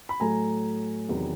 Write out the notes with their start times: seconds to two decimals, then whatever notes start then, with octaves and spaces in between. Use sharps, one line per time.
0.09 B5
0.20 A2 F#3 A3 G#5 A#5
1.09 E2 C3 D#3 F#3 B3